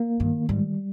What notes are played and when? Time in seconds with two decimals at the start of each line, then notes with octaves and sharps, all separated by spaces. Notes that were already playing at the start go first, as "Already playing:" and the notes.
Already playing: A#3
0.20 G2 D#3
0.49 G#2 G3